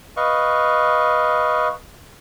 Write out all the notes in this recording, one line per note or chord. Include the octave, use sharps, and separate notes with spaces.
B4 D#5 F5 C#6